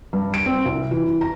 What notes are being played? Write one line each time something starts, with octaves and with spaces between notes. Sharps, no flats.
G2
D7
C4
C2
E3
E3
A#5